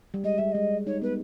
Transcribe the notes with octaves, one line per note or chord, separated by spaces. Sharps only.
G3
G#3 D#5
G3 E5
G#3 D#5
D#4 C#5
B3 B4